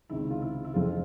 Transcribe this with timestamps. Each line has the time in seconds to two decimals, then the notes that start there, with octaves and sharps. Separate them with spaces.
0.09 C#2 C3 D#3 E4
0.30 F4
0.42 E4
0.64 E4
0.74 F1 F2 C#3 F4